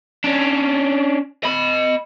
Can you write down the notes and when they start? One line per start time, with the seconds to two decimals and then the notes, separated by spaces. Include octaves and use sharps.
0.24 C#4 D4
1.44 D#5 B5